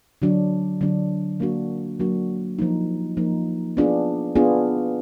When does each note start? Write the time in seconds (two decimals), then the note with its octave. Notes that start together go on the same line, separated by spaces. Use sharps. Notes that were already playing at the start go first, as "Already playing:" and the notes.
0.22 D3 F#3 D4
0.81 D3 F#3 D4
1.40 F#3 A#3 D4 F#4
2.00 F#3 A#3 D4 F#4
2.59 F3 A#3 D#4
3.17 F3 A#3 D#4
3.77 B3 D4 F4 G#4
4.35 B3 D4 F4 G#4